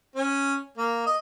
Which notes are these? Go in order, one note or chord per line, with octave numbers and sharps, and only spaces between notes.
C#4
A#3
D#5